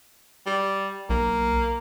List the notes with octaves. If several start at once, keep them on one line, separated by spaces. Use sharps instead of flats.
G3
B1 A#3